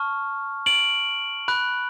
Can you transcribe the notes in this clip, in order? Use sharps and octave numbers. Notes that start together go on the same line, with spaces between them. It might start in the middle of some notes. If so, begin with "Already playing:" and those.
Already playing: A5 C#6 F6
D7 F#7
B5 F#6